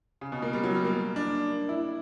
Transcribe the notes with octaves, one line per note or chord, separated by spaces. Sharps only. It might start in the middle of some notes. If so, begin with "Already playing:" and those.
C#3
B2
A#3
G3
F#3
G3
A#3
D4
E4